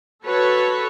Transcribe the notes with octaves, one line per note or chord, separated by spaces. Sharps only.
F#4 A4 B4 C#5